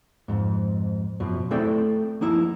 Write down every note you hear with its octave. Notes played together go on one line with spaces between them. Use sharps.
F2 G#2
F#2 B2 F3
A3 C4 E4 A4 D5 G5
F3 A#3 D#4 E4